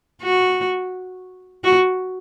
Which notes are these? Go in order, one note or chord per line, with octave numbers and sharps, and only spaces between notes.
F#4
F#4